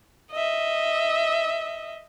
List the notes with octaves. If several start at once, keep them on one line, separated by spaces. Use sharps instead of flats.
D#5 E5